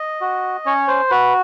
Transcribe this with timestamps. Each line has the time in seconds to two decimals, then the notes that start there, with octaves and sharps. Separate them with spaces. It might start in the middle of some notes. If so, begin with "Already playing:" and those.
Already playing: D#5
0.21 F#4
0.66 C#4 C#5
0.88 C5
1.10 F#4 B4